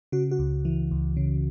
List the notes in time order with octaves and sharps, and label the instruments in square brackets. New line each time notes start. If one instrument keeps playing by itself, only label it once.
[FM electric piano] C#3 F#4
F#4
C#2
E3
C#2
C#3